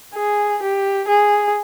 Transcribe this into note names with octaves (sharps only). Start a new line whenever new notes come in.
G#4
G4
G#4